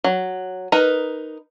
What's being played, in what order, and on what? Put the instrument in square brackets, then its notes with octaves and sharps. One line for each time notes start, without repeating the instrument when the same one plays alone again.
[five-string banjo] F#3
D#4 A#4 B4